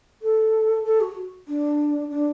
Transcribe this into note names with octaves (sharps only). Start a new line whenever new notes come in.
A4
A4
F#4
D4
D4